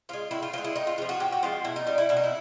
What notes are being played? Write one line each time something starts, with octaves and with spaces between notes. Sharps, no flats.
F3 G#3 F4
A2 E4
F4
F3 G#3 F4
E4
A2 D#4
F4
F3 G#3 F4
F#4
A2 G4
F#4
F3 G#3 F4
B2 E4
D#4
G3 D#4
E4
B2 E4
D#4
E4